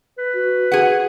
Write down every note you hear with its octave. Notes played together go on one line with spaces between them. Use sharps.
B4
F#4
G#4 F#5